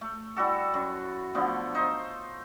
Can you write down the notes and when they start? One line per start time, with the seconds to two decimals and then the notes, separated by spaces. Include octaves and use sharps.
0.01 A3
0.36 G3 E4 F#4 A4
0.74 F#2
1.35 D3 F3 A3 B3
1.75 D#4 C5